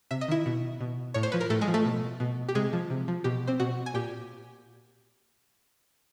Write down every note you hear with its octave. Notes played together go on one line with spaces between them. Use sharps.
C3 E5
D#5
D#3 E4 E5
B2
B2
A2 C#5
C5
F3 B4
A#4
A2 A3 A4
G#3 G#4
F3
A3 A4
B2
B2
G4
C3 G#3 G#4
F3
C3
F3
B2 G4
C4 C5
B2 F#4 F#5
G#5
A#2 G4 G5